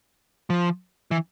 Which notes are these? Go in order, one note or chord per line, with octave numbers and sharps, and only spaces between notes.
F3
E3